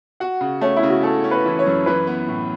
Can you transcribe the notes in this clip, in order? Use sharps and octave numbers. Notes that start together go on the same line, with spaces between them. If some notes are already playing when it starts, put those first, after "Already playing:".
F#4 F#5
C#3
A3 C#4
E4
C#3
F#4
A3 A4
C#4
B4
E3
C#5
F#2
E3 B4
B3
A2